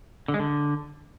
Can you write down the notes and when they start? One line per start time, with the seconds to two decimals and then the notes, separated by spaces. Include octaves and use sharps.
0.28 D3
0.34 G#3
0.40 D3